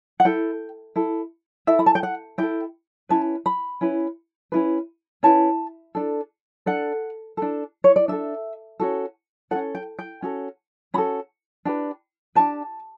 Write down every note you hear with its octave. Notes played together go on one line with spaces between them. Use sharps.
F#5
E4 A4 G5
E4 A4
E4 A4 E5
B5
A5
G5
F#5
E4 A4 G5
C#4 E4 B4 A5
B5
C#4 E4 B4
C#4 E4 B4
C#4 E4 B4 A5
D4 A4
D4 A4 F#5
D4 A4
C#5
D5
D4 A4 E5
C#4 F#4 A4
C#4 F#4 A4 F#5
G5
G5
C#4 F#4 A4
C#4 F#4 A4 B5
D4 G4 B4
D4 G4 B4 A5